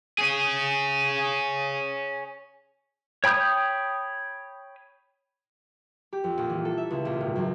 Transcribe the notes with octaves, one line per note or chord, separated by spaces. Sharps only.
C#4 G#4
C#5 G5 B5 D#6 G6
G4
F2
A#1
E3
A4
E5
C#2
A#1
G#1
F#2